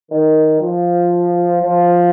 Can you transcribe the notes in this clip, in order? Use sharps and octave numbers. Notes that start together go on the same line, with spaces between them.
D#3
F3
F3